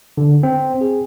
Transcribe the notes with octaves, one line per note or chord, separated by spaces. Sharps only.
D3
C4
G#4